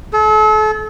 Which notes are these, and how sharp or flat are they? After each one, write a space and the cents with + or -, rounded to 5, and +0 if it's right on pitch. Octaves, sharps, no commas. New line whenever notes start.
A4 -40